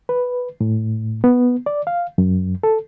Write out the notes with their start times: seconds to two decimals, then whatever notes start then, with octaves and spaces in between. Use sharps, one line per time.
0.09 B4
0.61 A2
1.24 B3
1.66 D5
1.87 F5
2.18 F#2
2.63 A4